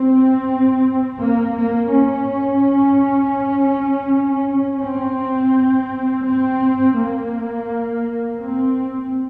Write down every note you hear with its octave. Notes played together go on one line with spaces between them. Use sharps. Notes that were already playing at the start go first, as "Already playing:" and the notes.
Already playing: C4
A#3
A#3
C#4
C4
C4
A#3
C4